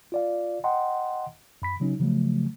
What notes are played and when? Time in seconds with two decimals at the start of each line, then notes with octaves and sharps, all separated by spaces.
0.12 F4 D5 F5
0.64 D#5 F#5 G5 A#5 C6
1.62 F#2 B5 B6
1.80 C#3 F#3 C#4 D#4
1.99 C#3 F3 F#3 A3